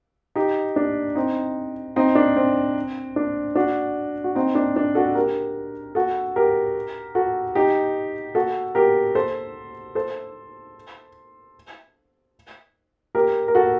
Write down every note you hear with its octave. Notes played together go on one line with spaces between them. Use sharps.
D#4 G4
D4
C4 D#4
C4 D#4
D4
C4
D4
D4 F#4
F#4
C4 D#4
D4
D4
F#4 A4
G4 A#4
F#4 A4
G4 A#4
F#4 A4
D#4 G4
F#4 A4
G4 A#4
A4 C5
A4 C5
G4 A#4
A#4
F#4 A4